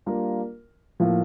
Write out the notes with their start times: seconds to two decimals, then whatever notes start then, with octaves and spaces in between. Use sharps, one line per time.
0.06 G3 A#3 D4 F4 A#4
1.00 A2 F3 A#3